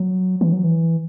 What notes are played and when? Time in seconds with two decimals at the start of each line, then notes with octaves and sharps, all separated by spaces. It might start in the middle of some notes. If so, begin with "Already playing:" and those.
Already playing: F#3
0.41 E3
0.53 F#3
0.64 E3